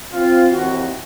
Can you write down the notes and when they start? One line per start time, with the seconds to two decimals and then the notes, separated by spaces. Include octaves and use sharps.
0.13 C4 F4
0.51 D#2 E3 C4 F#4